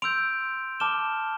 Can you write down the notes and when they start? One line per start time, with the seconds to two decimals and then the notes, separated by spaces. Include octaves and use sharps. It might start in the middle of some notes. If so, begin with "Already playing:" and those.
0.02 C6 E6 G6 D7 F7
0.80 A5 D6 F6 E7 G7